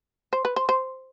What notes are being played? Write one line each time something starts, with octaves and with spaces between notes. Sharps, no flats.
C5
B4
C5
C5